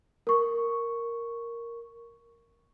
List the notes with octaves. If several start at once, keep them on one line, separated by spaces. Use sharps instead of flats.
A#4 C#6